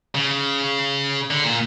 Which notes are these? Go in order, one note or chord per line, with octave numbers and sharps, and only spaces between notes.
C#3
D3
A#2